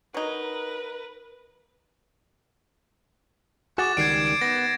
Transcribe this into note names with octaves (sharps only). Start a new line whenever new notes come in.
F#3 D#4 A#4 B4
F#4 G#4 F#5 D6 A6 E7
C#2 D#3 G3 G#6 C7 D7
D7
B3 A#6